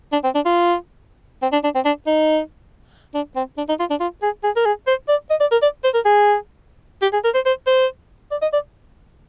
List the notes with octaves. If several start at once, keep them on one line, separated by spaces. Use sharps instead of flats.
D4
C4
D4
F4
C4
D4
D4
C4
D4
D#4
D4
C4
D4
D#4
F4
D4
F4
G#4
G#4
A#4
G#4
C5
D5
D#5
D5
A#4
D5
C5
A#4
G#4
G4
G#4
A#4
C5
C5
C5
D5
D#5
D5